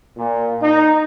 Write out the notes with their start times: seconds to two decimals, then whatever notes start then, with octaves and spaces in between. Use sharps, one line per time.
0.17 A#2
0.62 D#4